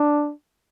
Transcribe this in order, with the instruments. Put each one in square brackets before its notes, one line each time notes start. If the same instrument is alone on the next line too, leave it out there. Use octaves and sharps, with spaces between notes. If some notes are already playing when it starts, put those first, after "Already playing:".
Already playing: [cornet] D4